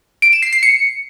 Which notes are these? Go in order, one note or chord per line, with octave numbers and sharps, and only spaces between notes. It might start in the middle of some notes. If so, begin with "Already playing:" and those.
D7
E7
C7
C7
C#7